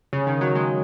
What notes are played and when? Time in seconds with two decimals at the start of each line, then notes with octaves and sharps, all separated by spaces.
0.13 C#3
0.27 D#3
0.41 F#3
0.55 G#3